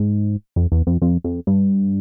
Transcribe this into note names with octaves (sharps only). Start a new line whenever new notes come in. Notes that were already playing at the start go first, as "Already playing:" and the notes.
Already playing: G#2
F2
E2
F2
F2
F2
G2